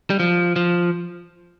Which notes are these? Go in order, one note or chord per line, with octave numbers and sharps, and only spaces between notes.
G3
F3
F3